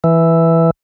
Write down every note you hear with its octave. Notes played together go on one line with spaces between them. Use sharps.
E3